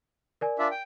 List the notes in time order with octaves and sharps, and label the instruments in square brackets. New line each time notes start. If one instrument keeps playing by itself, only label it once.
[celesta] A#4 D5 G#5
[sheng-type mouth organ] D4 F4 E5
G5